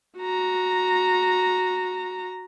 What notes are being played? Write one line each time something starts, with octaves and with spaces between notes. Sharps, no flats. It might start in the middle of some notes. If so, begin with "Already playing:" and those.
F#4 A#5